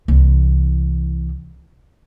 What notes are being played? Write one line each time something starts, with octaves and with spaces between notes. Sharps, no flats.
C2 E3